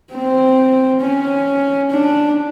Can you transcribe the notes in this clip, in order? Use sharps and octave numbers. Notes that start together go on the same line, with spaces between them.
C4
C#4
D4